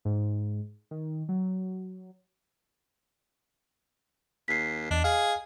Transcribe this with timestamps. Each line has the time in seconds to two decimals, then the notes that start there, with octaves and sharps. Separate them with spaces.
0.05 G#2
0.91 D#3
1.29 F#3
4.48 D#2 B6 C7
4.91 E2 D4 D#5
5.04 G#4 F5